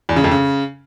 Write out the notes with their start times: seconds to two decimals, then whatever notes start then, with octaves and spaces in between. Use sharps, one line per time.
0.09 E2
0.16 C#3
0.24 F2
0.31 C#3